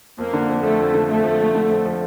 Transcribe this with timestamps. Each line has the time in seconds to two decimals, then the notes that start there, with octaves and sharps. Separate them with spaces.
0.18 F2 A#3
0.33 D3
0.48 F2
0.63 F3 A3
0.79 F2
0.94 D3
1.10 F2 A3
1.24 F3
1.40 F2
1.55 D3
1.70 F2
1.86 F3